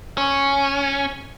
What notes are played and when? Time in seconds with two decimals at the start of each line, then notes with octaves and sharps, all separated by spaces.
0.18 C#4